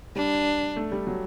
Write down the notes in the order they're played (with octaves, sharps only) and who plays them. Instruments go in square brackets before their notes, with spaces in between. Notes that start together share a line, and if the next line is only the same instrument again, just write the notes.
[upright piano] G3 [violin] D4
[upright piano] A3
G3
F#3